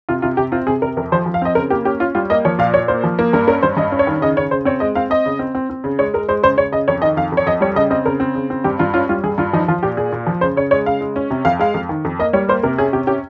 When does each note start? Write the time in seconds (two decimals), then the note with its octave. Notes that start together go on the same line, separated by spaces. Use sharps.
0.09 C3 F4
0.22 C3 F4
0.37 C3 G4
0.52 C4 F4
0.67 C3 G#4
0.82 C3 A#4
0.97 F2 A#4
1.12 F3 C5
1.26 F3
1.34 F5
1.42 C4 D#5
1.55 C#3 A#4
1.70 A#3 G4
1.85 C#4 G4
2.00 C#4 F4
2.15 G3 F4
2.30 A#3 D#5
2.45 F3 C#5
2.59 A#2 F5
2.74 A#2 C#5
2.88 A#3 C5
3.04 F3
3.19 A#3
3.33 G2 A#4
3.47 C#4 A#4
3.63 G2 C5
3.77 G2 D#5
3.92 C#4
3.99 C#5
4.07 D#3
4.21 C#3 D#5
4.36 C#3 C#5
4.51 C#3 C5
4.65 C4 C#5
4.80 G#3 D#5
4.95 C4 F5
5.10 C4 D#5
5.26 C#3
5.39 C4
5.55 C4
5.70 C4
5.84 C#3
5.99 G#3 C#5
6.14 G#3 A#4
6.29 G#3 C5
6.43 C#3 C5
6.57 C#3 C#5
6.72 C#3 D#5
6.88 F2 C#5
7.02 D#3 D#5
7.17 F2 F5
7.32 F2
7.37 C#5
7.46 F2 D#5
7.61 G3 C#5
7.75 C#3 D#5
7.90 C4 D#5
8.05 C#3 A#4
8.20 C4
8.35 C#3
8.50 C4
8.64 G2 G4
8.79 G2 F4
8.94 C#4 F4
9.09 G3 F4
9.24 G2 G#4
9.38 G2 F4
9.53 F3 D#4
9.68 F3 F4
9.83 A#2 G4
9.97 A#2 G#4
10.12 A#2
10.27 F3
10.41 C#3 C5
10.56 C#3 C#5
10.71 G#3 C#5
10.86 C#3 F5
11.01 G#3
11.16 C#4
11.31 C3
11.45 F2 F5
11.59 G#3 F5
11.74 F2
11.89 D#3
12.05 F2
12.19 A#3 D#5
12.33 G3 C#5
12.49 A#3 C5
12.63 C3 A#4
12.78 C#4 G#4
12.93 C3 G4
13.07 C#4 G4